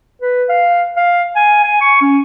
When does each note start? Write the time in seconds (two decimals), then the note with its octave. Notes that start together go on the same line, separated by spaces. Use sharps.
0.22 B4
0.49 F5
0.97 F5
1.36 G#5
1.64 G#5
1.81 C#6
2.02 C#4